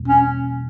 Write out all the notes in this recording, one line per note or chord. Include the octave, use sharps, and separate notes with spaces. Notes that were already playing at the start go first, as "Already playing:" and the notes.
Already playing: E2 B2 G3 A#3
C#4